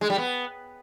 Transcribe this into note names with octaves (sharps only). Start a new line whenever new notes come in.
G#3
G3
B3